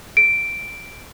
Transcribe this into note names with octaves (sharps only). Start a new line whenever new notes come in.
D7